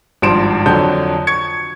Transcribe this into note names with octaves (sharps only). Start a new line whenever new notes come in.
G#1 G2 F3 C6 D7 E7
F2 D3 F#3 G6
C#6 G#6 C#7